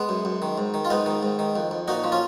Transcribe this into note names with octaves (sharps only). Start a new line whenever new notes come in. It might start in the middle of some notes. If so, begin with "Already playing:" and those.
Already playing: G#3 B3
F#2
F#2
D#3
G#2
D#3
F4
G#2 B3 D#4
D#3
G#2
D#3
F2
F2
A#2 D#4 F#4
F3
C#4 F4